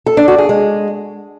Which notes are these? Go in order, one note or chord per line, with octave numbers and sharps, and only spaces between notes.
A4
D4
F#4
G#4
G#3